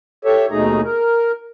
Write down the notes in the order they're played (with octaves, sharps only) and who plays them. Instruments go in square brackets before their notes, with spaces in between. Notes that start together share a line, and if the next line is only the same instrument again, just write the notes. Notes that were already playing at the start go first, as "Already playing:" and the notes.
[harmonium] G4 A4 C#5 E5
D#2 B2 A3 D#4 G#4 A#5
A#4